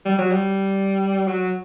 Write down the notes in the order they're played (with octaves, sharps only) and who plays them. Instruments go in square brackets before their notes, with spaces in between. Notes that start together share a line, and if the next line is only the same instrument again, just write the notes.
[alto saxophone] G3
F#3
G3
F#3